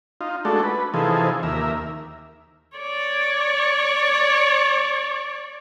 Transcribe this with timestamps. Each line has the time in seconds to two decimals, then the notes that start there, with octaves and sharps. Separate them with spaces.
0.21 D#4 F4
0.45 G#3 A3 D4 F#4 A4
0.63 B4
0.94 C3 E3 F3 D#4 G#4 A4
1.43 D#2 A#4 E5
2.77 C#5 D5